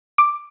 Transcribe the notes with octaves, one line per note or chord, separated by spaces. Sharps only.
D6